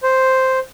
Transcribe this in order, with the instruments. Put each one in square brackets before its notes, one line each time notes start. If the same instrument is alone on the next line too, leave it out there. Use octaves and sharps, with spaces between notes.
[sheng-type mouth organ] C5